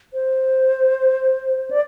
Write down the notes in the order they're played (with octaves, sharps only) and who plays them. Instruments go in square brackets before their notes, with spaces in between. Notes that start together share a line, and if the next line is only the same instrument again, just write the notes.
[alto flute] C5
D5